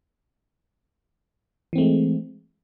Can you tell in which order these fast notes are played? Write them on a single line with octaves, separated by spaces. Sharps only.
E3 C4 A3 G#3